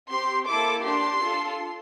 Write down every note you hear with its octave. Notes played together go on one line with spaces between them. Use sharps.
C4 G4 C6
A#3 E4 A4 D6
D4 G4 C6
D4 F4 A4